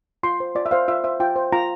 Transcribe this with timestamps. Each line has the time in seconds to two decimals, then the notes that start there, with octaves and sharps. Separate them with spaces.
0.23 F4 C6
0.40 C5
0.55 F4 D5
0.66 E5
0.71 C5 F5
0.88 F4 E5
1.04 C5 E5
1.20 F4 G5
1.36 C5
1.52 F4 A#5